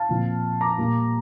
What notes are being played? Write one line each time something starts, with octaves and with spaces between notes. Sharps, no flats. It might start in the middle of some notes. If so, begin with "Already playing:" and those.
Already playing: F5 A5
A#2 F3 C4
A#5 D6
A#2 G3 A#3